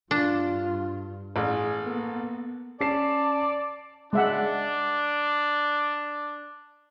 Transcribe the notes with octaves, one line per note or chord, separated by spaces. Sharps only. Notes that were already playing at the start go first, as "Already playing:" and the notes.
G2 D4 F4
A1 G#4
A#3 B3 A4
C#4 D5 A5 C7 E7
G#3 D4 E5 F#5